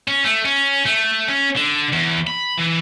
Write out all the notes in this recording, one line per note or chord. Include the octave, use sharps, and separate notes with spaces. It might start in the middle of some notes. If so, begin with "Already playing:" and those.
C#4
A3
C#4
A3
C#4
D3
E2
B5
E3